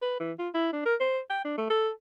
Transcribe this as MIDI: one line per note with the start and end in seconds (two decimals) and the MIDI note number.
0.02 0.20 71
0.20 0.32 52
0.39 0.49 65
0.54 0.70 64
0.72 0.85 62
0.86 0.95 70
1.00 1.20 72
1.30 1.42 79
1.44 1.57 62
1.58 1.66 57
1.70 1.90 69